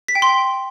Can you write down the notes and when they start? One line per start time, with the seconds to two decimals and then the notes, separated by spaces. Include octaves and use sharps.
0.08 B6
0.15 G5
0.22 C6
0.29 G5